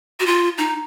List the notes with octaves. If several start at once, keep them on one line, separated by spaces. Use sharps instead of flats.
F#4
F4
D#4